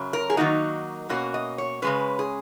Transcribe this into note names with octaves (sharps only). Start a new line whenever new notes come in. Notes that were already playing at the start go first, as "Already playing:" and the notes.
Already playing: F#2 C#3 F#3
A#4
G#4
D#3 F#3 A#3 D#4 F#4
B2 A#3 C#4 F#4
D#5
C#5
C#3 G#3 C#4 B4
G#4